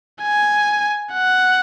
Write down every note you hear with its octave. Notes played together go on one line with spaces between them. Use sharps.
G#5
F#5